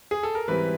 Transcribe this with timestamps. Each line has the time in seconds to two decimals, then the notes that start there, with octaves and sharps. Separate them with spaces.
0.11 G#4
0.23 A4
0.35 A#4
0.48 G#2 E3 G3 C4 B4